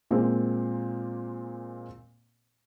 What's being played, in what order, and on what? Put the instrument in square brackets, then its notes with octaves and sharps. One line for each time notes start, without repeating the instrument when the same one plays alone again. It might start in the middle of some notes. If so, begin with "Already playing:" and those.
[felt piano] A#2 G#3 A#3 C4